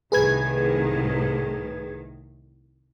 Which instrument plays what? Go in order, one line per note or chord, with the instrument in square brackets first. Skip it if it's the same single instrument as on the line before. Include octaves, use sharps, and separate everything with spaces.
[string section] C2 A2 D#3 [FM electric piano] G#4 B4 G#6